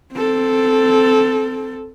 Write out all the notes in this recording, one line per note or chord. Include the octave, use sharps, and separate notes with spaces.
C4 A4